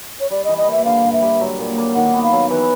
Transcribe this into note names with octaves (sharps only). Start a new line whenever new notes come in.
C#5
G3 D5
E3 D#5
D#5
A#3 E5
D3 F5
G2
E5
G3
F#3
A#2
A#3
D#3 F#5
B3
F5
F#3
E3 B4